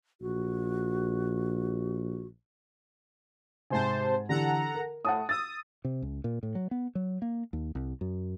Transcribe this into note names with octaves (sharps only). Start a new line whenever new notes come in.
A#1 F#4
G#2 C3 C5 G#5 A5
D3 E3 G4 A4 F#5 A#5
A#4
A2 F#5 A5 D#6
D#6 E6 A6
C3
C#2
A#2
A2
F#3
B3
F#3
A#3
D#2
C2
F#2